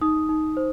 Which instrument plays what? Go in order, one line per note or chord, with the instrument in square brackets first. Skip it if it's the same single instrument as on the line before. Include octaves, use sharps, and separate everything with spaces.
[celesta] D#4 D#6
D#4
C5